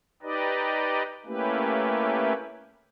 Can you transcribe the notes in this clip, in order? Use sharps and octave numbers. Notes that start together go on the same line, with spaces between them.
D#4 G4 B4 D5 D#5
A3 A#3 C#4 E4 G4 B4